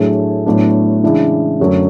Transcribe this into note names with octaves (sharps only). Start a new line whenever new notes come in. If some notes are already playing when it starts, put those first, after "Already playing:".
Already playing: A2 F#3 A3 D4 G#4
A2 F#3 B3 D4
C#3 E3 G#3 D4
F#2 D3 F#3 A3 D4